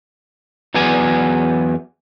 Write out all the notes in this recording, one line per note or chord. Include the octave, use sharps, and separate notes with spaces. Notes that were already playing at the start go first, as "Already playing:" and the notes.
E2 F#3 B3 G#4 D5 G#5